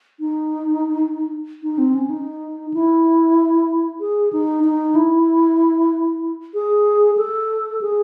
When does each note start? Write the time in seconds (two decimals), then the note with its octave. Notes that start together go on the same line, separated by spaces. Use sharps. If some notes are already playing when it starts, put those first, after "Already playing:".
0.20 D#4
1.63 D#4
1.78 C4
1.95 C#4
2.10 D#4
2.74 E4
4.00 G#4
4.33 D#4
4.64 D#4
4.95 E4
6.54 G#4
7.17 A4
7.81 G#4